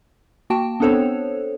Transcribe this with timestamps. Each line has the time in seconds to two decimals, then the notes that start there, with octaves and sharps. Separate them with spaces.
0.50 A#3 F#4 G5 A5
0.80 B3 C4 D4 A4 C5 C#5